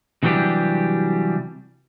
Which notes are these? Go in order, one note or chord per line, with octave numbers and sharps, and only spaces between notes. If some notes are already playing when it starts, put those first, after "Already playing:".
C3 E3 F#3 G3 D4 G4